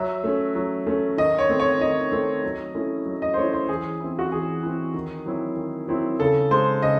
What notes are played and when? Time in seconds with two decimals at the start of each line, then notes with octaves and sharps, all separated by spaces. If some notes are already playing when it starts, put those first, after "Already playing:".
Already playing: F#3 E5
0.24 A3 C#4
0.55 F#3
0.87 A3 C#4
1.17 D#3 D#5
1.39 C#5
1.49 A3 C4
1.59 C#5
1.80 D#3 D#5
2.12 A3 C4
2.44 F#3
2.75 A3 C#4 E4
3.06 F#3
3.22 D#5
3.34 C5
3.37 A3 C#4 E4 C#5
3.53 C5
3.68 E3 G#4
4.00 C4 E4
4.19 F#4
4.31 E3 G#4
4.63 C4 E4
4.94 D#3
5.26 F#3 C4 E4
5.57 D#3
5.88 F#3 C4 E4
6.19 C#3 A4
6.51 G#3 D#4 C5
6.82 C#3 D#5